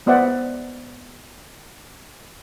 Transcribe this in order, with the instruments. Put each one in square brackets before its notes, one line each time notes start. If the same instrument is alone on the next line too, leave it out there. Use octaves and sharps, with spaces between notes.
[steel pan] G#3 B3 C5 D5 E5 F#5